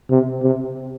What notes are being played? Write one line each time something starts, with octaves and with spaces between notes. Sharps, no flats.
C3
C3